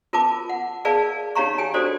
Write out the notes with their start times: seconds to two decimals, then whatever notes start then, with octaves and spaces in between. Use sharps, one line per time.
0.13 F4 A#4 B4 A5 D6
0.49 F#5
0.85 G#4 A#4 B4 D5 F5 A5
1.35 D#4 G4 C#5 F5 A#5 C#6
1.58 G4 G5 G#5
1.74 D4 F#4 A4 C5 D5